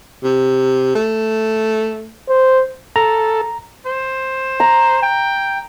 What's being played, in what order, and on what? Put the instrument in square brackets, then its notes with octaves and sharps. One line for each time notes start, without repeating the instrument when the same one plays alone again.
[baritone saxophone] C3
A3
[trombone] C5
[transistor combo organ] A4 [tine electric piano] A#5
[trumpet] C5
[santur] A#5
[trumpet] G5